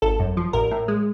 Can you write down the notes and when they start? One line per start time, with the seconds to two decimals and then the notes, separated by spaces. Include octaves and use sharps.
0.02 G#1 A4
0.20 F#2
0.37 F3
0.53 A1 A#4
0.71 A2
0.88 G#3